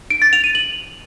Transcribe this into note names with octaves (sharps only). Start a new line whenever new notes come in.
D7
A6
F7
D#7
F#7